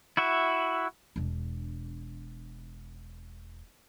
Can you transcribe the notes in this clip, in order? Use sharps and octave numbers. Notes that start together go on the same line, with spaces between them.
E4 F#4 E5
E1 D4